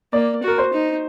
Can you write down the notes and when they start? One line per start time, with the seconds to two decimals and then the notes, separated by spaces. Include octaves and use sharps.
0.13 A#3 D5
0.43 F#4 A#4
0.58 C5
0.73 D#4